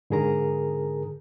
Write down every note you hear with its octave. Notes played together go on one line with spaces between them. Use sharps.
G#2 D3 G#4 A#4 A#5